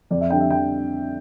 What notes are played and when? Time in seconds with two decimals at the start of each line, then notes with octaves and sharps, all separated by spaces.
0.11 F2 D5
0.21 E5
0.30 D3 G3 G5
0.40 E5
0.50 F2 G5